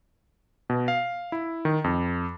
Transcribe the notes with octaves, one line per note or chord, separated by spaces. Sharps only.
B2
F5
E4
D#3
F2